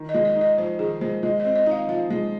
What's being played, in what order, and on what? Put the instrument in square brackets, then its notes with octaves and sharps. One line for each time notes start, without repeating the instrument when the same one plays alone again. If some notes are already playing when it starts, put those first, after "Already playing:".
Already playing: [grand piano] D#3
[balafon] D#5
[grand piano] G#3
[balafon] D#5
[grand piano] D#4
[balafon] D#5
[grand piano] F2 [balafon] C5
[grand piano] D#3 [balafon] G#4
[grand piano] G#3 [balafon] C5
[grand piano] G#3 [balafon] D#5
[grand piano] C4 [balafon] D#5
[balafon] D#5
[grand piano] D#4
[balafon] F5
[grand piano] F3 [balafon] F5
[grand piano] G#3